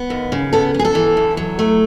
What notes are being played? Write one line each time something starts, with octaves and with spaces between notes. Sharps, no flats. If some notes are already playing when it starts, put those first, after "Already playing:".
Already playing: B3
D#2
C#3
B3 A4
B3
G#4
A4
E3
E2
F#3
A3